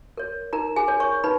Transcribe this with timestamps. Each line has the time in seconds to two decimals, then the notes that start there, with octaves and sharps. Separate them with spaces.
0.17 A#4 C#5
0.53 D#4 A#4 A#5
0.76 G#4 G#5
0.88 A#4 C#5
1.00 C#5 C#6
1.24 D#4 B4 B5